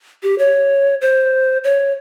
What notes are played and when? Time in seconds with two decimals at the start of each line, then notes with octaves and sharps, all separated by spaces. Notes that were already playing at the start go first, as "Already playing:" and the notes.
0.23 G4
0.38 C#5
1.01 C5
1.64 C#5